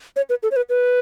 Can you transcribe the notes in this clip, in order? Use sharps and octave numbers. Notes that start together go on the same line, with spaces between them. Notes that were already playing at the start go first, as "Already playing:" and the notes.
C#5
B4
A4
C#5
B4
B4